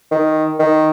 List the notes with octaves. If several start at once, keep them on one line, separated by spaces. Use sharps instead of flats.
D#3
D#3